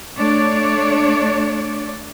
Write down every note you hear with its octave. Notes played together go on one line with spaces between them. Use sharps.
A3 D4 C#5 D5